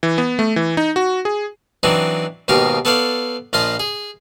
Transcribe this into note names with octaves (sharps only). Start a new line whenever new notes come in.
E3
B3
A3
E3
D#4
F#4
G#4
E3 F#3 C4 D4 D#4
D#2 G#2 B2 D#4 G4 F5
B3 A4 C#5 D5 F5
A#1 F3 F4 D#5 C6
G#4